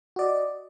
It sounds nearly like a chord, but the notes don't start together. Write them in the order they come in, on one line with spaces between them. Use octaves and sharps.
F#4 D5 D#5